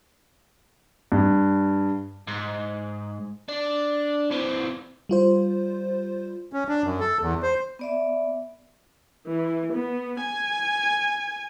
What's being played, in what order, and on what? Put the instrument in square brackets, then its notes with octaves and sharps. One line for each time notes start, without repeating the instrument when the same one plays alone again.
[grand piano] G2
[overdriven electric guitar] G#2
D4
E3 C4
[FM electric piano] G3 F4 C5
[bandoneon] C#4
D4
F#2
A4
E2
C5
[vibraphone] B3 D5 E5
[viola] E3
B3
G#5